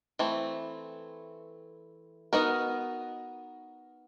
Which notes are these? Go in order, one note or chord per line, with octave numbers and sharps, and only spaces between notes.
E3 A3 C4
B3 D#4 F#4 A#4